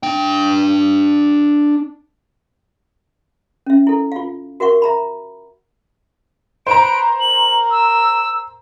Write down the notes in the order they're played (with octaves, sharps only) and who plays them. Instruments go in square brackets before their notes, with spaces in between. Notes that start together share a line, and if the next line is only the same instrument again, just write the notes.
[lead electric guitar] D4 G5
[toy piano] C#4 E5
E4 A4
F4 F5
F#4 A#4 E5 F#5 C#6
E5 A#5 B5
[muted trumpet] B4 [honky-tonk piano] C5 A#5 [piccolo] D7
[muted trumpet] A#4 [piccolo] F#7
[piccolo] E6